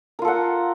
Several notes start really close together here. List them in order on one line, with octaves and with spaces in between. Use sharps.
A#4 F4 A4 F#5